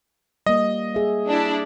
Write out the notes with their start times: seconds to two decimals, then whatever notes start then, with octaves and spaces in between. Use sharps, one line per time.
0.46 G3 A#3 D#5
0.95 G#4 E5
1.29 D4 E4